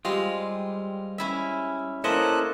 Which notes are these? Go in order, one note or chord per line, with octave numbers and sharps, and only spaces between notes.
G3 G#3 C4 F4
C#4 E4 E5
A#3 C#4 E4 A4 C5 D#5 C#6 F#6